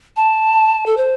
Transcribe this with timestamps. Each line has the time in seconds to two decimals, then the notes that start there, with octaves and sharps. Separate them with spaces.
0.16 A5
0.86 A4
0.97 C5